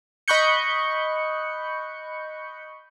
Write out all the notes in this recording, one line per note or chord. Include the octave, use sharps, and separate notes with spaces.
D#5 B5 C#6 F#6 G6 C#7